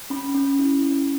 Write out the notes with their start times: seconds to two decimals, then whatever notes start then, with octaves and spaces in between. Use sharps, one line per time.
0.10 C#4 B5
0.34 C#4
0.59 E4
0.83 C#4